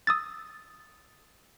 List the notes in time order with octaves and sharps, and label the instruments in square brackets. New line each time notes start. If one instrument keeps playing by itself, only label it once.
[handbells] D#6 E6 A6